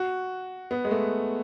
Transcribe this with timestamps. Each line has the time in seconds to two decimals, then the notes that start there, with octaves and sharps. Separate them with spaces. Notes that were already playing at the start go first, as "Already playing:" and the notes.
Already playing: F#4
0.71 B3
0.85 G#3
0.91 A3